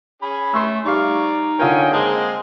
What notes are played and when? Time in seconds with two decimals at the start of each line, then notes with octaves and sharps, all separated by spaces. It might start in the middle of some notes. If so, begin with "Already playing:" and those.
0.22 C#4 G#4 B5
0.54 A3 C6 C#6 E6
0.86 G3 D#4 D5 F5 C#6
1.59 D3 C#4 F4 A#4 C#5 D#5 G5 G#5
1.92 G#3 A#3 C4 G#4 A#4 D#5 A5 D#6